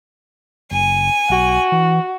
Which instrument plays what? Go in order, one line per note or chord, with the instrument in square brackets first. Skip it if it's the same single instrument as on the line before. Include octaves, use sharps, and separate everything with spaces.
[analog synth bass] F#1 [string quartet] G#5
[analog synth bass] B1 [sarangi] F#4
[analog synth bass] E3